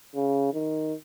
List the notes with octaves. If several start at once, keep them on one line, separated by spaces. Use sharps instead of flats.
C#3
D#3